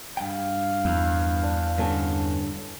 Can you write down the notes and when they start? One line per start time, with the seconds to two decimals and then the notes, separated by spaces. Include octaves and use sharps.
0.17 G2 F5 G5
0.85 E2
1.43 D4
1.78 G2 D3 B3 C#4 A4